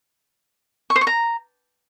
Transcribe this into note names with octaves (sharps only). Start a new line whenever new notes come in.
C#6
C5
C#6
A#5